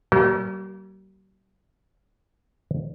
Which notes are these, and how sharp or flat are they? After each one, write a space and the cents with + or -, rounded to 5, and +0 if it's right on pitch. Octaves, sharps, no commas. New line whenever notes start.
G3 -45 A#3 +0 G4 -45